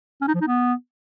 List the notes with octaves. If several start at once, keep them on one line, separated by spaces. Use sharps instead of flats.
C#4
D#4
F3
D#4
B3